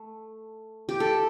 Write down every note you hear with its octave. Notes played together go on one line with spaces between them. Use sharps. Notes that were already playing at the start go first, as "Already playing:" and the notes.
Already playing: A3
G4
A4